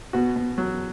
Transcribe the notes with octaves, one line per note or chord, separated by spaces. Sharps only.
B2 F#4
B2
F#3